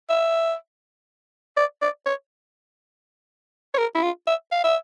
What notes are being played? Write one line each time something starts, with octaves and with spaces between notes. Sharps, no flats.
E5
D5
D5
C#5
C#5
A#4
E4
F4
E5
F5
E5